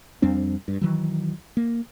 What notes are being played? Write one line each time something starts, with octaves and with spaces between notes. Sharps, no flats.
F2 G3 C4 D4
G2
D#3 E3 F#3
A#3